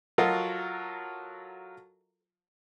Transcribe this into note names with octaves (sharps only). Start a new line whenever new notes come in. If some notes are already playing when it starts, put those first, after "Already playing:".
F#3 F4 F#4 A4 A#4 D#5